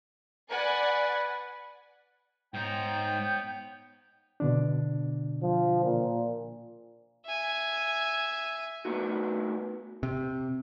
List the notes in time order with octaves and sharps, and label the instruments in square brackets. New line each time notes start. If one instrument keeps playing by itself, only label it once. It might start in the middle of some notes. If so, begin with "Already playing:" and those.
[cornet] B4 [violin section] D5 F#5 G#5
[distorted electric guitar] G#2 D#4 [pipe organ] B3 C#5 G6 [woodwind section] G5
[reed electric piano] B2 D3 D4
[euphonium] F3
A#2
[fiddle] E5 G#5
[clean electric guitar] A3 B3 D4 D#4 F#4
[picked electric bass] C3